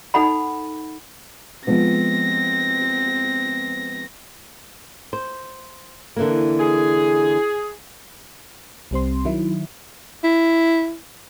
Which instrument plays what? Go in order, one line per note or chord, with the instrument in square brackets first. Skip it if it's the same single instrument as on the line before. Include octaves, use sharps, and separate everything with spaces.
[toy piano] D#4 A4 F#5 B5
[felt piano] F3 G#3 B3 [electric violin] C4 A#6
[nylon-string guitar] C5
D3 E3 A#3
[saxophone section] G#4
[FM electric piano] C2 G3 C4 C6
D#3 F#3 E4
[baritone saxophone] E4